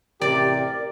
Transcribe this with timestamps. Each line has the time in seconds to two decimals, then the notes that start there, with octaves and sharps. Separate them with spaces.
0.21 A1 C3 G4 A#4 D5